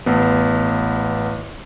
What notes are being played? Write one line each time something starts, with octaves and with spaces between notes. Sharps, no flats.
A1 B3